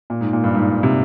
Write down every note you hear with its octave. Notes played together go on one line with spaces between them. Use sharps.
A#2
G#2
A#2
G2
G#2
C3